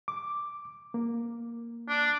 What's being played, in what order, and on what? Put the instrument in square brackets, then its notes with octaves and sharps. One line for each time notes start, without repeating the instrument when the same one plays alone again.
[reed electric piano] D6
A#3
[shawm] D4